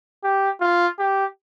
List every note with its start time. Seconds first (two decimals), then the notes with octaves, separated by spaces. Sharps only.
0.23 G4
0.61 F4
0.99 G4